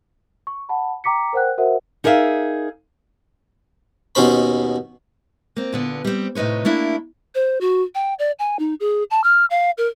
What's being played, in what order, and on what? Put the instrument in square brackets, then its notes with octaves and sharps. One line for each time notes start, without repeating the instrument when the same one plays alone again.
[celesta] C#6
F#5 A5 B5
G5 A#5 D6 B6 C#7
A#4 C5 F#5 G5 F#6
F#4 A#4 C5 E5 F#5
[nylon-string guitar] D#4 G#4 A#4 D5 E5 F5
[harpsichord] D#2 B2 C#4 C5 B5
[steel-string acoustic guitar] A#3 C4
A#2 D3 B3
G3 C4
A2 C3 D#4 B4 C#5
A3 A#3 D4 E4
[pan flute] C5
F#4
G5
D5
G#5
D#4
G#4
A5
F6
F5
A#4